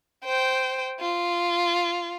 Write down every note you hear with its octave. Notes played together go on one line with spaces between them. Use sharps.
C5 G5
F4